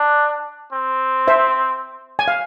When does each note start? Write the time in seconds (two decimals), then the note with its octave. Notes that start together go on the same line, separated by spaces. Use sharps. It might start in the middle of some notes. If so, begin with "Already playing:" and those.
Already playing: D4
0.73 C4
1.28 C5 E5
2.19 G#5
2.28 F5